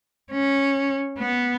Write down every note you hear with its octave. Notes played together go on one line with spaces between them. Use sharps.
C#4
B3